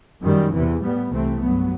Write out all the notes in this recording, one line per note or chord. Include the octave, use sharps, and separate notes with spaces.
F#2 D#3 G3
E2 C3 E3
A2 G3 B3
C2 C3 E3 A3 C4
G2 F#3 B3